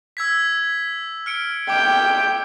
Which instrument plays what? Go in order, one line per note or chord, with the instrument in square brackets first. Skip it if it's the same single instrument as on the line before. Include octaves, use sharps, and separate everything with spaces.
[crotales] E6 G#6 B6
F6 C#7 D7
[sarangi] G5 [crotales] D6